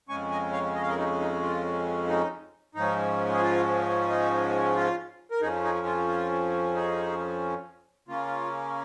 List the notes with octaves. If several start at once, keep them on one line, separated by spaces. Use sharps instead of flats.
F2 C#3 G#3 C#4 G#5 C#6
D#5 G#5
C#5 F5
D#5
F5
A#4 D#5
D#4
D#4
F4
D#4
G#2 F3 G#3 C#4 D#4
G#4
F4
D#4
F4
A#4
F2 F3 C#4 D#4 G#4
D#4 G#4
F4
F4
D#4 G#4
C#3 A#3 C#4 F4